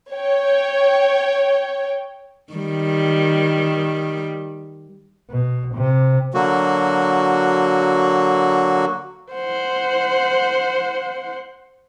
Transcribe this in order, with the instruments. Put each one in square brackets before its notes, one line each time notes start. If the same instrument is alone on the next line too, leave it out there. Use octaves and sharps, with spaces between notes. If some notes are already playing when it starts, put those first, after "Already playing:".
[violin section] C#5 G5
[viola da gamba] D#3 G3
[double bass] B2
C3
[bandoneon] D3 F#3 A#3 F#4
[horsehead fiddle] C5 F#5